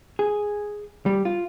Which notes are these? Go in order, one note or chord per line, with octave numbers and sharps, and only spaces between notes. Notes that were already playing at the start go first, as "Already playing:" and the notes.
G#4
G3
F4